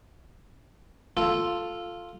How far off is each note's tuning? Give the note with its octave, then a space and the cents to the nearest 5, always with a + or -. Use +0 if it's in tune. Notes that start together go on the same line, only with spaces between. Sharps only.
F4 +0 A4 +0